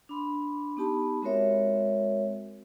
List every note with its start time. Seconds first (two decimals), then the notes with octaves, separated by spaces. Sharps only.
0.09 D4 B5 C6
0.77 B3 D#4 G4 A5 B5
1.22 G#3 C4 F#4 A#4 C#5 E5